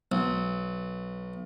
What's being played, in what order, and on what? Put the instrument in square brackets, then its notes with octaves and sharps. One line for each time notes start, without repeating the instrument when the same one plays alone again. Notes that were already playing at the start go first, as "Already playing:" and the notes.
[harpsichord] B1